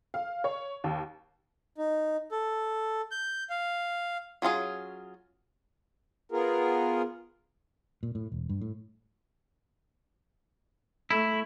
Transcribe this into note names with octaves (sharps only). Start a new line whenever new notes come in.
F5
C#5
D#2
D#4
A4
G6
F5
F#3 C#4 F4 G#4
B3 F4 G#4 A#4
A#2
A2
E1
G2
A2
A3 E4